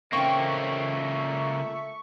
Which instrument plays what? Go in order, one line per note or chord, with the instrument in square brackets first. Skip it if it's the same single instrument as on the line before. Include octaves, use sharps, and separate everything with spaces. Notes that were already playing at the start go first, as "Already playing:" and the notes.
[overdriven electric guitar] C#2 A#3 [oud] C4 C#4 [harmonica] A4 E5 [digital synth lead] C#6